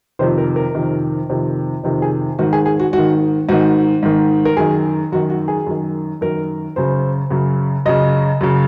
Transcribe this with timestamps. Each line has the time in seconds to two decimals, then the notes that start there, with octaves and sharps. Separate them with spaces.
0.19 F2 C3 D#3 C5
0.38 A#4
0.56 A#4
0.75 F2 C3 D#3
1.30 F2 C3 D#3
1.83 F2 C3 D#3
2.02 G#4
2.39 G#2 D#3 F#4
2.53 G#4
2.66 G#4
2.80 F#4
2.93 G#2 F#4
2.98 D#3
3.49 G#2 D#3 F#4
4.03 G#2 D#3
4.45 A#4
4.57 F#2 D#3 G#4
5.12 F#2 D#3 F#4
5.30 F#4
5.48 G#4
5.67 F#2 D#3
6.21 F#2 D#3 A#4
6.76 F#2 C#3 C5
7.31 F#2 C#3
7.86 F#2 C#3 D#5
8.41 F#2 C#3